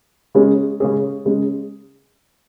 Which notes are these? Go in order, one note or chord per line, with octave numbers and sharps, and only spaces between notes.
C#3 G#3 C#4 G#4
C#3 G#3 C#4 G#4
C#3 G#3 C#4